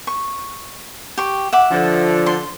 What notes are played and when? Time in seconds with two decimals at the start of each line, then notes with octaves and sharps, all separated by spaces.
0.07 C#6
1.18 G4 C#6
1.53 E5 F#5 D6
1.71 D3 F3
2.26 C6